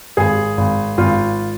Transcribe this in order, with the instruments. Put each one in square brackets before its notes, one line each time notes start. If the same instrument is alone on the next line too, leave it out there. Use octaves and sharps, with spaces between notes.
[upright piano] G#1 G#4
G#1
G#1 F4